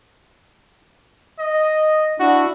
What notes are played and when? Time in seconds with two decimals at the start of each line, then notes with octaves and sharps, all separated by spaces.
1.39 D#5
2.20 D4 E4 F#4